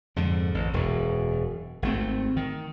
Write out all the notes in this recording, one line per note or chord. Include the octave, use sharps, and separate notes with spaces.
F2 G#2 D3
A1
E1 F#2
G#1 A3 C4
D#3